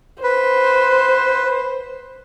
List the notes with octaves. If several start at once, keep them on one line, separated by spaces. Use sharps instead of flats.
B4 C5